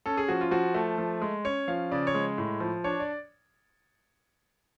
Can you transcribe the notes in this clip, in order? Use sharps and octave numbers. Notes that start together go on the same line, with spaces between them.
C#4 A4
G#4
F3 F#4
F4
F3 F#4
A3
F3
G#3
C#4 C#5
F3 F5
C#3 D5
C#5
G#3
A2
F3
D4 C#5
D5